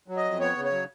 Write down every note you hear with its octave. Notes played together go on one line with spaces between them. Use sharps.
F#3
D#5
F2
B3 C#5
C#3
C#5
F#3